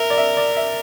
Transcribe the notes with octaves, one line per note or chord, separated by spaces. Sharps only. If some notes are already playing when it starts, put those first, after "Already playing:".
Already playing: A#4 E5
D5
E5
D5
E5